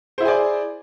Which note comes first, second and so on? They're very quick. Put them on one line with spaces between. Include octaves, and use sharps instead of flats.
C5 E4 G#4 G#5 D5